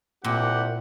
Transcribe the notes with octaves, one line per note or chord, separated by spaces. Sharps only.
C2 A#2 G4 F#5